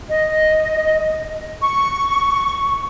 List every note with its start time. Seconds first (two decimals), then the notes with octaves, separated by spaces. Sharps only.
0.08 D#5
1.62 C#6